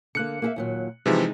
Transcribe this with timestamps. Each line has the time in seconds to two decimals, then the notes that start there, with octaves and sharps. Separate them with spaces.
0.15 D3 A#3 F#6 C#7
0.42 A#3 G#4 E5
0.56 D#2 A#2 F#3
1.06 C3 E3 F3 G#3 D#4